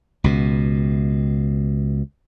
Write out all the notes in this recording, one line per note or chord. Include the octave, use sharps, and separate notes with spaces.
C#2 B2